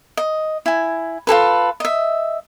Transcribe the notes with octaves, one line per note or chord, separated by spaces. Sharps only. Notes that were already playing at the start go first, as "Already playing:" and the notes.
D#5
E4 G#5
F4 G#4 A4 B4
D#5 E5